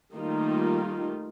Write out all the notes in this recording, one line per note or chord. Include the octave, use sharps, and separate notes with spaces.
D#3 G3 A3 A#3 D#4 F4